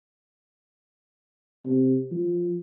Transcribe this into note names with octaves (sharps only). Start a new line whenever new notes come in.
C3
F3